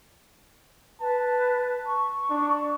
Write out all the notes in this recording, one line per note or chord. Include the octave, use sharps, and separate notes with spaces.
B4 A5
C#6
D4